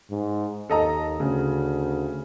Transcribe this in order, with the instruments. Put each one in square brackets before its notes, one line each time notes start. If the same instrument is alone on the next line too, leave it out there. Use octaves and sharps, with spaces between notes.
[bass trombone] G#2
[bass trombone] D#2 [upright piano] A4 D#5 A#5
[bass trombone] D2 [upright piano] C#3